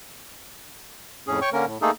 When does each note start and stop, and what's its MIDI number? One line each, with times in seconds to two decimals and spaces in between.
1.27 1.39 41
1.27 1.39 45
1.27 1.39 61
1.27 1.39 68
1.42 1.50 73
1.42 1.50 79
1.42 1.50 85
1.53 1.65 50
1.53 1.65 58
1.53 1.65 61
1.53 1.65 70
1.66 1.78 45
1.82 1.91 57
1.82 1.91 58
1.82 1.91 63
1.82 1.91 68
1.82 1.91 69